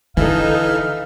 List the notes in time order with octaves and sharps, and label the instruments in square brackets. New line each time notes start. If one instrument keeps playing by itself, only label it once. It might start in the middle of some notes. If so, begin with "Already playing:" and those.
[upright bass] D3 [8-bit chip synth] E3 [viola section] D#4 A4 [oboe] F5